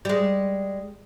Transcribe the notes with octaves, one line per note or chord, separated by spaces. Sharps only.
G3 G#3